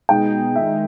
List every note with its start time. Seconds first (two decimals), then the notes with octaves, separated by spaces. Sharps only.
0.09 B2 G#3 B3 D#4 G#4 G5
0.55 D#3 G#3 D#4 E5